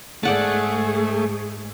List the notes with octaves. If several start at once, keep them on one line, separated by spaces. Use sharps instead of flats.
G#2 A3 G#4 D5 F#5 A5